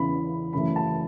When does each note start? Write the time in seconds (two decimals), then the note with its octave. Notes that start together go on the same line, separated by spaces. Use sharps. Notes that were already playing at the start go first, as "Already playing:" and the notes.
Already playing: E2 C#3 E3 C#4 B5
0.53 F#2 C#3 E3 A3 B5
0.76 A5